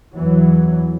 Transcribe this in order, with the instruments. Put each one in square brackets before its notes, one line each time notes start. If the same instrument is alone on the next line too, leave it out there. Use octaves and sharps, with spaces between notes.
[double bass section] E2 E3 F#3